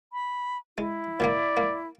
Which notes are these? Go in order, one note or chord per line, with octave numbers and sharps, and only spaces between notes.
B5
G#3 E4
A#2 D#3 A#3 D5
A#3